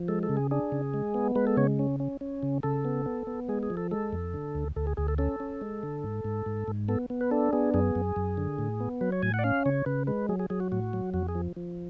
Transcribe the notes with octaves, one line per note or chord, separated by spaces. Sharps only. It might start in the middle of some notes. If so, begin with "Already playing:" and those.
Already playing: F3
G#3 A4
A4
C#3
G#4
D4 G#4
C#3
G#3
B3
G#3 B4
A4
C#3 C#5
C#4
C#4
C#4
C#3
C#3 A4
B3
B3
B3
G#3 G#4
G#4
F3
A4
G#3 A4
F2
D3
D2
D2 A4
G#4
D2 G#4
A4
C#4 A4
C#4
G#3
D3
G#2
G#2
G#2
G#2
B3 A4
B3
B4
D4 A4
B3 G#4
F#2 G#4
F#2
F#2
D3
A2
B3
F#3 B4
C#5
A2 G#5
F#5
D5
C#4 F5
C#3 C#5
C#3 B4
G#3 B4
F#3 G#4
G#4
F#3 G#4
F#4
A2 F#4
F#3
F2 F#4
G#4
F3
F3